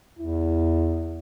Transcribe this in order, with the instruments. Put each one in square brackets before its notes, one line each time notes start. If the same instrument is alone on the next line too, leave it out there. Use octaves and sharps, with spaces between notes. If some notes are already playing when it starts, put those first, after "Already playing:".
[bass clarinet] E2 [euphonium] E4